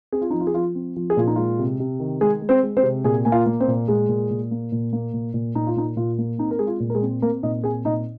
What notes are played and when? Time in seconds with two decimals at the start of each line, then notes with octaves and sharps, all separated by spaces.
0.12 C4 G#4
0.22 F4
0.30 F3 D#4
0.40 F4
0.47 G#4
0.54 F3 F4
0.75 C4
0.96 F3
1.10 G#4
1.17 A#2 F4
1.27 D#4
1.36 G#3 F4
1.59 C3
1.80 C3
2.00 D#3
2.21 G#3 G#4
2.42 G#3
2.49 C4 C5
2.63 G#3
2.77 C4 C5
2.83 C3
3.04 A#2 G#4 G#5
3.25 A#3 G#5
3.32 F4 F5
3.46 A#3
3.60 C4 C5
3.68 A#2
3.88 A#2 G#3 G#4
4.09 A#2
4.31 A#2
4.51 A#3
4.72 A#2
4.93 A#3
5.14 A#2
5.34 A#2
5.55 A#2 D#4
5.67 F4
5.76 A#2 D#4
5.96 A#2 F4
6.18 A#3
6.38 C4 D#4
6.51 A#4
6.59 G#3 G#4
6.67 F4
6.80 A#2
6.90 A#4
6.95 G#3 G#4
7.02 C4
7.22 A#3 C4 A#4
7.43 A#2 D#4 D#5
7.64 C4 G#4 G#5
7.85 A#2 D#4 D#5